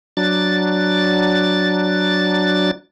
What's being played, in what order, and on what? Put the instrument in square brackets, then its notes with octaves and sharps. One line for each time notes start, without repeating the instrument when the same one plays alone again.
[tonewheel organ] F#3 D4 A6